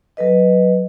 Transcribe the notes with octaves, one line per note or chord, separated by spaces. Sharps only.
F#3 A4 B4 D#5